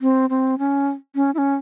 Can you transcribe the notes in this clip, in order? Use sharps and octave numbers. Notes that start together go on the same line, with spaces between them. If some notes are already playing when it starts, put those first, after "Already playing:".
C4
C4
C#4
C#4
E4
C#4